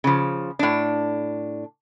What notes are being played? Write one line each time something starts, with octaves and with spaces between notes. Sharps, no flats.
C#3 F3
A2 D4